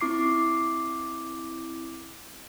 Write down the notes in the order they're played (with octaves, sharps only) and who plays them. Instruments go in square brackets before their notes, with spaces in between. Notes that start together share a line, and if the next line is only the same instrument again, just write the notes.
[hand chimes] C4 E4 D6 C7